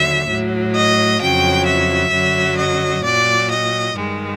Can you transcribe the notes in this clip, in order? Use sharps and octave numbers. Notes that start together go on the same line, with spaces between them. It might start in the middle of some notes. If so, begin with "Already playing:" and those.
Already playing: D#2 D3 F#3 E5
A2 F#3
D#5
F2 C#3 F#3 G5
E5
F#2 D3 F#3
D#5
A#2 F#3 D5
D#5
G2 D#3 G#3